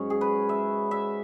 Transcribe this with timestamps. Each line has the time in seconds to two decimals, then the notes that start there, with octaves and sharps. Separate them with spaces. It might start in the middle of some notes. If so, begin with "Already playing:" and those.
Already playing: G#2 F#3 C#4
0.10 G#4
0.21 B4
0.49 E5
0.91 E5